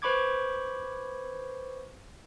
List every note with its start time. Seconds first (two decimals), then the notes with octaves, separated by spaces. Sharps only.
0.02 B4 C5 B5 C#6 D6 G#6